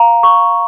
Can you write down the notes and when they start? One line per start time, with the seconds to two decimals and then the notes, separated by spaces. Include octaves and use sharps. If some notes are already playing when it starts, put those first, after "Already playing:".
Already playing: F5 A#5
0.23 C#6